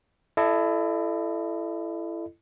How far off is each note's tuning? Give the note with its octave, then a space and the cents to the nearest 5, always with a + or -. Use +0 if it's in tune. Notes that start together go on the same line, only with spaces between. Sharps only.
E4 +25 A4 -5 D#5 -35